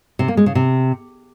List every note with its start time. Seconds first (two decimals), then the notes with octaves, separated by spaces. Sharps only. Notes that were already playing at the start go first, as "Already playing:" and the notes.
0.19 C3
0.28 A#3
0.37 G#3
0.46 C#3
0.55 C3